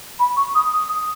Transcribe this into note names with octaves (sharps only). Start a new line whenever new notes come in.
B5
C#6
D#6
D#6